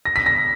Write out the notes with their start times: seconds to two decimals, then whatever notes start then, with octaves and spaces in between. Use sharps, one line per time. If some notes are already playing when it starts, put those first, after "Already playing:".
0.05 A#6
0.16 B6
0.26 A#6